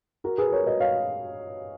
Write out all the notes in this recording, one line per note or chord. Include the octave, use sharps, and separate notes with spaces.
F#4 A#4
G#4 B4
A#4 C#5
B4 D#5
C#5 F5